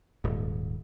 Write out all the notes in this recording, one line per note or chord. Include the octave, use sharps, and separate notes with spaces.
D#1 G#2